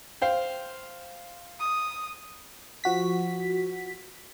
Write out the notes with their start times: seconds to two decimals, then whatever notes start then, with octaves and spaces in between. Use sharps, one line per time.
0.22 C5 F5 G5
1.60 D#6
2.84 F3 F#4 B6